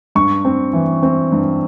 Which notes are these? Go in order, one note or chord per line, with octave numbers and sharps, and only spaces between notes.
G2 C#6
C4
E3
C4
G2